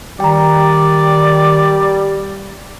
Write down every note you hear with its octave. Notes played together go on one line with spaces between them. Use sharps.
D#3 G3 D5 G5 A#5